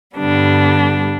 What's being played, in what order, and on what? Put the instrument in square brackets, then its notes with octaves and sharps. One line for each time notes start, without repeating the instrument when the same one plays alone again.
[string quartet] G2 D3 G3 B3 D4